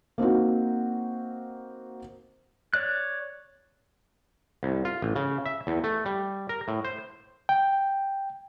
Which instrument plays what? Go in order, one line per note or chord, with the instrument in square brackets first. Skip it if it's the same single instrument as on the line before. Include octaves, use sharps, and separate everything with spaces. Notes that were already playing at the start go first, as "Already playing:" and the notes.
[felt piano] A#3 C4 D#4 F#4
[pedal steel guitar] C#5 D5 F#6
[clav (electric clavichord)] C2
F4
A1
C#3
E5
E2
A3
G3
A#4
A2
C5
[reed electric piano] G5